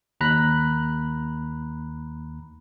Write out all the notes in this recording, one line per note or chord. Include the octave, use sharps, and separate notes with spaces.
D#2 A#5 B5 F#6